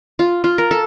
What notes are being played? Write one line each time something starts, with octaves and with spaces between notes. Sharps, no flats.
F4
F4
A#4
A4